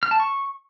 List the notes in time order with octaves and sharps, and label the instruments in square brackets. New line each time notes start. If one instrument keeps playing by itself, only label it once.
[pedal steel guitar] F6
A5
C#6